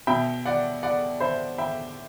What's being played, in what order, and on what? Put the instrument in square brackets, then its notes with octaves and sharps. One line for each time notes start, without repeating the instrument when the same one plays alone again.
[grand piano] B2 E5 G5
D5 F#5
D5 F#5
C5 E5
E5 G5